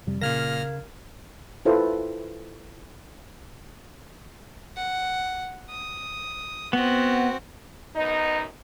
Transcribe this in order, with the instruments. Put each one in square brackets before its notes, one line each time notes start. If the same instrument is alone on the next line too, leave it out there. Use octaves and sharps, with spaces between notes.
[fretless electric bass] F2 C3 G3
[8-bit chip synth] A#2 F6 A#6 [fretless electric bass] C#3 [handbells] A#4 F5 G#6
[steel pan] E4 F4 A4 B4 C5
[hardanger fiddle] F#5
D#6
[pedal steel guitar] B3 [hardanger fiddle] C4 F#4
[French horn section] F#2 B3 D#4 [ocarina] D#5